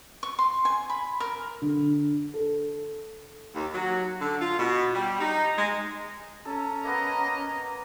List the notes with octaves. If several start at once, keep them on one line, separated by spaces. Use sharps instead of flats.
C#6
C6
G#5
B5
A#4
D3
A4
D#2
F#3
D3
F4
B2
G3
D#4
G#3
C#4 A4 A#5
A#3 B3 D#5